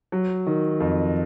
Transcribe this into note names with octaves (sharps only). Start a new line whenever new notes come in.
F#3
D#3
F2